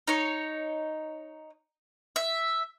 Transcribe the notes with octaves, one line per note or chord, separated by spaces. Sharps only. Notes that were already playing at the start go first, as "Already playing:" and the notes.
D#4 C#5
E5